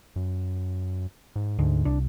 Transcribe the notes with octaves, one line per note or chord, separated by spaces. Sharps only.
F#2
G#2
D2 G#2
C2 D4